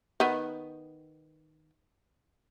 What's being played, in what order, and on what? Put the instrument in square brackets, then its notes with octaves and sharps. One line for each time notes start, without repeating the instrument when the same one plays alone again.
[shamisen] D#3 B3